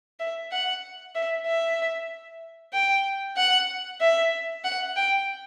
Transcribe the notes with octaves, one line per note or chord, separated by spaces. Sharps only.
E5
F#5
E5
E5
G5
F#5
E5
F#5
G5